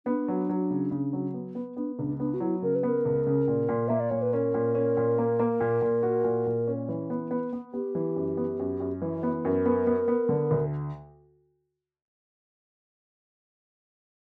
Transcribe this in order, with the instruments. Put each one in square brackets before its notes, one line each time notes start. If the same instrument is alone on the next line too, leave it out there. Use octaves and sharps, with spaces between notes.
[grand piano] B3 [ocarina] D4
[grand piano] F#3
F#3
C#3
C#3
F#3
B3
B3
[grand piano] B3 [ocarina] D4
[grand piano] C#2 [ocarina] D4
[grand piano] B3 [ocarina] D4
[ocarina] F#4
[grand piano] F#3 [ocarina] E4
[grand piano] C#3 [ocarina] A#4
[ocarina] B4
[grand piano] B3 [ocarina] A#4
[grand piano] C#2
C#3
A#2
A#2
[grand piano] A#3 [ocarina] E5
[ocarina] D5
[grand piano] A#2 [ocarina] C#5
[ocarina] B4
[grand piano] C#4 [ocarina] A#4
[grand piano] A#2
C#4
A#2
A#3
A#3
A#2
A#2
F#4
A#2
A#2
C#4
E3
B3
B3
B3
[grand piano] B3 [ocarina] G4
[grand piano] E3
F#2
B3
F#2
F#2
E3
B3
[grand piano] F#2 [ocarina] A#4
[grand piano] B3
B3
B3
D3
D2